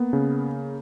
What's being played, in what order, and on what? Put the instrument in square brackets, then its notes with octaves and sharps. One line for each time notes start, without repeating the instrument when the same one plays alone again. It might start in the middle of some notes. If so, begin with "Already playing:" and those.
Already playing: [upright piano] A#3 [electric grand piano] B3
[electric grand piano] C#3